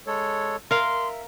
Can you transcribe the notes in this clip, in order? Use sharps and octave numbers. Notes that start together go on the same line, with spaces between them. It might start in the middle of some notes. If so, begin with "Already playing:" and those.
G#3 A4 C#5
A#4 E5 F5 C6